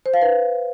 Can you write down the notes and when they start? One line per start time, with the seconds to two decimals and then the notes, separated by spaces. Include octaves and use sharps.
0.06 C5
0.14 F5
0.22 B4